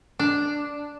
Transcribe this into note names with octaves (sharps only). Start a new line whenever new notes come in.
D4